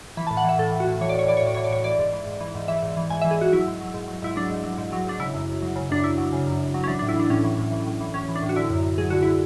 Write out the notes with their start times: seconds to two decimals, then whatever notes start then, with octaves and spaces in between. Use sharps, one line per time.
0.17 E3 B5
0.27 A2 A5
0.37 F#5
0.44 E3 E5
0.59 A2 A4
0.72 E3
0.80 F#4
0.87 A2
1.01 E3 C#5
1.09 D5
1.15 A2 C#5
1.28 E3 D5
1.37 C#5
1.42 A2 D5
1.55 E3 C#5
1.64 D5
1.71 A2 C#5
1.84 E3 D5
1.99 G#2
2.13 E3
2.26 G#2
2.40 E3
2.55 G#2
2.68 E3 E5
2.83 G#2
2.97 E3
3.10 G#2 G#5
3.21 E3 E5
3.31 G#4
3.38 G#2 F#4
3.52 F#3 E4
3.67 G#2
3.81 F#3
3.94 G#2
4.08 F#3
4.22 G#2 E4
4.36 F#3 D4
4.50 G#2
4.64 F#3
4.78 G#2
4.92 F#3
5.07 G#2 D4
5.20 C#3 E4
5.34 F#2
5.49 F#2
5.62 F#3
5.76 C#3
5.90 F#2 D4
6.04 F#2 E4
6.18 F#3
6.33 C#3
6.46 F#2
6.60 F#2
6.74 F#3
6.84 C#4
6.88 E3 D4
6.99 A2 D4
7.08 E4
7.15 E3 D4
7.30 A2 C#4
7.44 E3
7.58 A2
7.72 E3
7.87 A2
8.01 E3
8.14 A2 C#4
8.29 E3
8.36 D4
8.43 A2
8.49 F#4
8.56 D3 E4
8.70 F#2
8.83 F#2
8.98 F#3 G#4
9.10 D3 F#4
9.23 E4